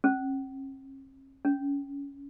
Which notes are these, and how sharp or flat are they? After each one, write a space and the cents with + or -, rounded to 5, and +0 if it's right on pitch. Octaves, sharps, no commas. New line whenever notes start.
C#4 -45
C#4 +20